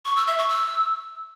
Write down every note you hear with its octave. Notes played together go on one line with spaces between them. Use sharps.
C#6
E6
E5
C#6
E6